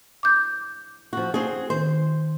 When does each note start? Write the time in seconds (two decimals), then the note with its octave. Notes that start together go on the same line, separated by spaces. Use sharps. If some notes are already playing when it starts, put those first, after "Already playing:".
0.23 D6 G6
1.13 F3 F#4
1.34 C4 F#4 G#4
1.70 D#3 C5